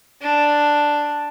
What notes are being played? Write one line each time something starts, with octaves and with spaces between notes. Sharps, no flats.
D4